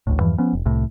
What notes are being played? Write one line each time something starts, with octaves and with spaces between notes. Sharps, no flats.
A1 D2 A2
E2 G2 E3 F3
F3 B3 C#4
F1
C2 A2